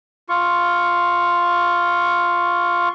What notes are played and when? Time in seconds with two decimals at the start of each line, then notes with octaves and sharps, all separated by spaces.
0.29 F4 C#6